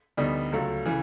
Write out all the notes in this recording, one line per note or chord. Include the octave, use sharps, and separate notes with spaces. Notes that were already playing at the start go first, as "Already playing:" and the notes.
D2 D3 G3 B3 D#4
C#2 C#3 F#3 A3
C#3 E3